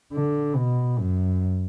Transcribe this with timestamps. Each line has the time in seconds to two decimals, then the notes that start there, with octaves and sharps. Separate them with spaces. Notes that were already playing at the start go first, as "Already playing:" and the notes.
0.13 D3
0.56 B2
0.99 F#2